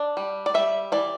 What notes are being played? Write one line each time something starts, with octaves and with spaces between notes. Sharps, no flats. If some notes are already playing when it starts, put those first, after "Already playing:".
Already playing: D4 D5
G3
D5
G3 E5
E3 D5